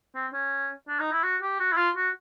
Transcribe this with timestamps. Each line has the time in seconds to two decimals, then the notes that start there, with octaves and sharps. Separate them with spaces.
0.15 C4
0.33 C#4
0.88 D4
1.00 D#4
1.12 E4
1.24 F#4
1.42 G4
1.60 F#4
1.72 E4
1.77 F4
1.96 F#4